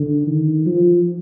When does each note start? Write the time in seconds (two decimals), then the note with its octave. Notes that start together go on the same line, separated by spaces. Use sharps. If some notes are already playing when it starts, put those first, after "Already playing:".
Already playing: D3
0.27 D#3
0.66 F3